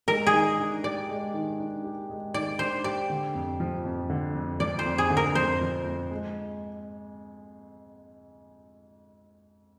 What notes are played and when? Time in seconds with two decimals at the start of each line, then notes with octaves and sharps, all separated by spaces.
0.08 G#3 A#4
0.27 G#4
0.33 D#3
0.59 D4
0.84 G4 D5
1.09 G#3
1.34 D#3
1.59 D4
1.84 G4
2.09 G#3
2.34 D#3 D5
2.59 D4 C5
2.84 G4 D5
3.10 D3
3.35 F2
3.60 F3
3.85 F2
4.10 D3
4.35 F2
4.60 F3 D5
4.79 C5
4.85 F2
4.98 G#4
5.10 D3
5.17 A#4
5.35 F2 C5
5.61 F3
5.86 F2
6.11 G#3